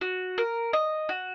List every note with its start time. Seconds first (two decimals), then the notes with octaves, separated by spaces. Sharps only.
0.01 F#4
0.38 A#4
0.73 D#5
1.09 F#4